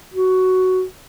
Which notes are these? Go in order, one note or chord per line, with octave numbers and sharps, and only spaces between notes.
F#4